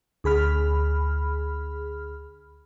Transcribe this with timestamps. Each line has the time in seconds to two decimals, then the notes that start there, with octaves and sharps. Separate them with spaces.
0.24 D2 G#4 B5 F6